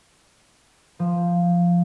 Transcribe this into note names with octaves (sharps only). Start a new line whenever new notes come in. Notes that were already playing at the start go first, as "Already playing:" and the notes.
F3